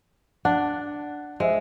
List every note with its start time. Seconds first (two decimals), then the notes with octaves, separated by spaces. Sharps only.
0.45 D4 F#5
1.40 G#3 C5 D#5 E5